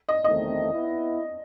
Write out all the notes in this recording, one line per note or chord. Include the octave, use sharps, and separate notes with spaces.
D#5
F#1 E2 D#3 A3 C4 D#5
B3 E4